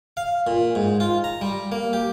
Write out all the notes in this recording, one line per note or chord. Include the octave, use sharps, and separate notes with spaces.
F5
A#2
G#2
F4
A#5
G3
A#3
G4